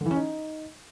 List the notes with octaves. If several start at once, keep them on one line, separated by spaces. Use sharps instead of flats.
D3
E3
C#4
D#4